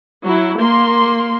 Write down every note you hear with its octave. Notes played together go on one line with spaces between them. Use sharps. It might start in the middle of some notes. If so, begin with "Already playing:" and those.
F#3 E4
A#3 C6